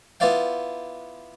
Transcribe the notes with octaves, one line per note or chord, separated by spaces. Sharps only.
B3 E4 F4 D5 F5 G5